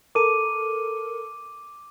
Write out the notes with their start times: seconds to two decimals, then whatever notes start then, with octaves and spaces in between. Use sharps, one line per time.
0.15 A4 A#4 D6 D#7